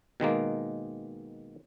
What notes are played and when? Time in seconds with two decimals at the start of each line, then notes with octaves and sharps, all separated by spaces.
0.20 B2 D#3 G#3 A#3